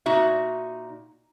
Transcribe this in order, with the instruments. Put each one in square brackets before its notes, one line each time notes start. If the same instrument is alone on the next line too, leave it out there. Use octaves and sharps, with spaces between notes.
[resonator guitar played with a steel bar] A#2 D#4 F#4 E5